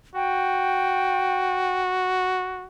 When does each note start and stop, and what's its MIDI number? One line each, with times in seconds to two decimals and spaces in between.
0.15 2.67 66
0.15 1.82 79